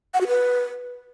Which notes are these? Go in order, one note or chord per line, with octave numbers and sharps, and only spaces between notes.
F#5
F#4
B4